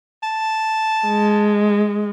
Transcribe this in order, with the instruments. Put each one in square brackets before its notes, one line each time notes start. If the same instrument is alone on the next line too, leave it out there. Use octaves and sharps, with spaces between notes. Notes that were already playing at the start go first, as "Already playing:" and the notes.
[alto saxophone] A5
[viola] G#3